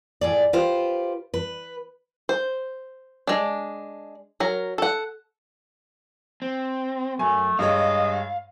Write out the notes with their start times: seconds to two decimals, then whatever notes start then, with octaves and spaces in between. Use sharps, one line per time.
0.21 A2 G#4 D5
0.53 F4 G4 B4 C5
1.34 B4
2.29 C5
3.27 G#3 D4
4.40 F#3 A#4
4.78 A4 F#5
6.42 C4
7.19 F#2 A3 G#5
7.59 G2 G#3 C#5 D#5 F5